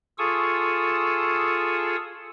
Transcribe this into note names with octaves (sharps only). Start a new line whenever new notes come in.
F4 G#4 A4 C#6 D#6 E6